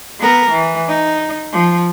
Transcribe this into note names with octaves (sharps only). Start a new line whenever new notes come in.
B3 A#4
E3
D#4
F3